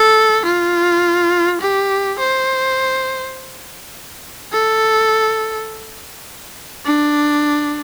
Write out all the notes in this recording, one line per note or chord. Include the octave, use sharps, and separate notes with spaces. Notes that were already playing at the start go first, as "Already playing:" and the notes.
Already playing: A4
F4
G4
C5
A4
D4